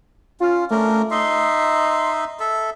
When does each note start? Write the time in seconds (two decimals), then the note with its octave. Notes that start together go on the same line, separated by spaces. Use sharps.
0.40 C#4 F4
0.71 A3 C#4 D4 A#4
1.11 D#4 D#5 E5 C6
2.40 A4 E5